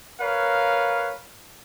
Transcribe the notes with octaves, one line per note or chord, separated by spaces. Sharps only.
A#4 B4 C#5 F5